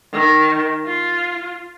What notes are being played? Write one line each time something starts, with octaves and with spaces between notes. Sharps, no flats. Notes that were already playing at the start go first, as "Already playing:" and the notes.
D#3
F4